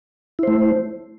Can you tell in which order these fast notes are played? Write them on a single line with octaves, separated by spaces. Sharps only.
E4 C5 A3